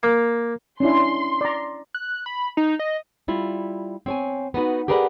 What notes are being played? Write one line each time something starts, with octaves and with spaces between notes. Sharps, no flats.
A#3
C#4 D4 E4 C6
D5 A#5
F#6
B5
D#4
D#5
G3 E4 F4
C4 C#5 G#5
B3 D#4 F#4 B4
G4 G#4 A#4 B4 D5 F#5